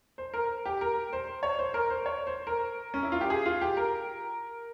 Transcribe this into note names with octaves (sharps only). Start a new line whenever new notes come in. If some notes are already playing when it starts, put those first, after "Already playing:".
C5
A#4
G4
A#4
C5
C#5
C5
A#4
C5
C#5
C5
A#4
C#4
E4
F4
G4
G#4
F4
G4
A#4